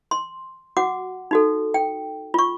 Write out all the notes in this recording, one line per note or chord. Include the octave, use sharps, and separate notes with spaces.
C6
F#4 F#5 D6
D#4 F#4 A4
G5
F4 C#6